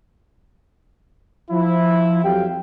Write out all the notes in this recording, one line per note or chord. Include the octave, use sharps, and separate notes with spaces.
F3 E4
F2 F#3 G4 F5 G5